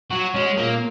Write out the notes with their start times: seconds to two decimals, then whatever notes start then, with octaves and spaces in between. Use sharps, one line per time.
0.11 F#3 F#4
0.34 G#3 C#4
0.57 A#2 A#3